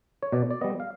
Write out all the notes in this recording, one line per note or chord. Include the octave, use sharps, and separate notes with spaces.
C#5
B2 D5
D5
G3 B3 D#5
F5